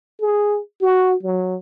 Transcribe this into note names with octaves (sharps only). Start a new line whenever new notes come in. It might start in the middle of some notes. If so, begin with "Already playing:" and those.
G#4
F#4
F#3